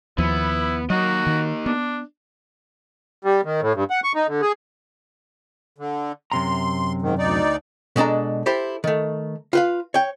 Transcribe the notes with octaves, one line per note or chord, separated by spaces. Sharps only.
D#2 F3 B3 E4
F#3 A#3 D#4 F#4 D#5
D#3
B3 D4
G3
D#3
A2
G2
F#5
C#6
D#4
D3
G#4
D3
F#2 C3 A#5 C6
G#2 D#3
D2 D#4 D5
B2 G#3 D4 A4 A#5
E4 G4 A4 C5
D#3 A3
F4 B4 F5
C#5 G5